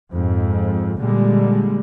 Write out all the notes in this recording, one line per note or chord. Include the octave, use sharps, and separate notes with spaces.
F2 G#2
A#2 D3 G3 G#3